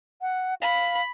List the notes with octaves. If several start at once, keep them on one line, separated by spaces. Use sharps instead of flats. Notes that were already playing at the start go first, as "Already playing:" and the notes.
F#5
F5 B5